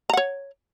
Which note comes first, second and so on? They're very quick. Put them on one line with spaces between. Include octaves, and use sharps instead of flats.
A#5 F#5 C#5